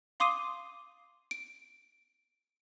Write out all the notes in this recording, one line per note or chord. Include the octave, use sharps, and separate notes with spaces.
F5 C6 D6 D#6 C7 D#7
D7